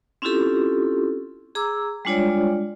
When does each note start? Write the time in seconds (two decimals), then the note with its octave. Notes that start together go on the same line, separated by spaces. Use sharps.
0.22 C4 C#4 E4 F4 G4 A4
1.55 G#4 A#5 D6 E6
2.05 G3 G#3 D4 F4 C#5 D5